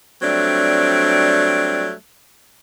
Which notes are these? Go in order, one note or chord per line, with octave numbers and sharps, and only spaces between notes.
F#3 G3 A3 C4 D4